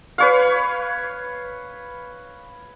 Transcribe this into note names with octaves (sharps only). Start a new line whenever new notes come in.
B4 C#5 F5